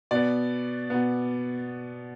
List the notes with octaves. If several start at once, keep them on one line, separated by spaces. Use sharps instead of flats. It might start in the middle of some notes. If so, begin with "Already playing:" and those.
B2 B3 D5
B2 B3